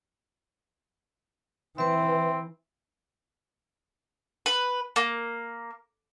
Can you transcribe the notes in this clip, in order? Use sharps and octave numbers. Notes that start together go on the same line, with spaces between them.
E3 C4 B4 E5
B4
A#3